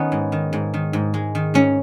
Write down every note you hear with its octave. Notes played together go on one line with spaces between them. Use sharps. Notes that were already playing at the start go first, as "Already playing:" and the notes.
Already playing: D#3 B3 C#4 D#4
G#2
D#3
G#2
D#3
G#2
G#3
D#3
G#2 C#4